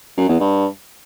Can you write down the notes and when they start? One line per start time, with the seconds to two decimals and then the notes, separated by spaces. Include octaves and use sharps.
0.17 F#2
0.29 E2
0.40 G2